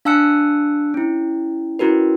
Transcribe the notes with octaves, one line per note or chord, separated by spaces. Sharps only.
D4 F5 A5 E6 F#6 C#7
C#4 E4
C#4 E4 F#4 A#4 B4